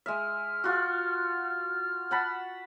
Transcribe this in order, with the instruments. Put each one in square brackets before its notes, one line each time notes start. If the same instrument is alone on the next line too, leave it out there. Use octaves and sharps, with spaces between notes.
[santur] G#3 E5 [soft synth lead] F6
[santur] F4 F#4
F#5 A5 B5